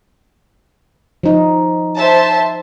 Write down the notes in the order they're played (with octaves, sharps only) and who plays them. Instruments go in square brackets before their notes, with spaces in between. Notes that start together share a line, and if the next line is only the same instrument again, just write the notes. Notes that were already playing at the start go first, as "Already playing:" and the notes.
[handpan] F3 D#4
[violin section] C5 E5 A5